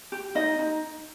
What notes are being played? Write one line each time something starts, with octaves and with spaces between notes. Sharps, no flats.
G4
D#4 D#5
D#4